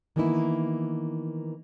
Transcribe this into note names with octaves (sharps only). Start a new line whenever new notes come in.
D#3 E3 A#3 B3 D#4 E4